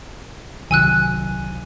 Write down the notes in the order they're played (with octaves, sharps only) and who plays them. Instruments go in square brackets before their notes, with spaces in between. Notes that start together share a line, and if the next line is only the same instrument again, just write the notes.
[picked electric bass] C2 D#3 F#3 [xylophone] G#5 E6 F#6